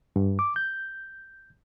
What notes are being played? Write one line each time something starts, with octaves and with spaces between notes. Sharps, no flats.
G2
D6
G6